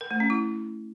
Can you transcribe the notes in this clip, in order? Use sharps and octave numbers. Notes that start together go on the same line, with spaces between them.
A#4
A3
C#4
E4